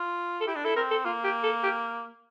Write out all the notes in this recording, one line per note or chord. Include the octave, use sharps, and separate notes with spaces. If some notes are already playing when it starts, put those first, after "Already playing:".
Already playing: F4
A4
E4 G4
D4
E4 A4
C4 A#4
A4
A#3 F4
G4
A4
G4